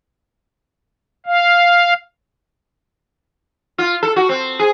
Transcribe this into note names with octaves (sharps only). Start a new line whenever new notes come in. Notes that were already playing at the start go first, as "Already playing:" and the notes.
F5
F4
A4
F#4
C4
G#4